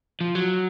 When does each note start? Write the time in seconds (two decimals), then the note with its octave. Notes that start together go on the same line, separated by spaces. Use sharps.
0.21 F3
0.35 F#3